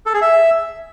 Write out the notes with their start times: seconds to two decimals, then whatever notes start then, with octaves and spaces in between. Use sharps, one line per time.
0.06 A4
0.14 G#4
0.22 E5